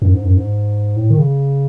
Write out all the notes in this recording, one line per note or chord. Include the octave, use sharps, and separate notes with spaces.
F#2
G#2
F#2
G#2
A2
D#3
C#3